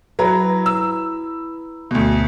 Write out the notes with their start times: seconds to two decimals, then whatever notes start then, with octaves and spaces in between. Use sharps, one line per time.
0.19 F#3 E4 B4 A#5
0.66 E6
1.91 D2 B2